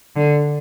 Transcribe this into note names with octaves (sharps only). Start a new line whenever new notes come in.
D3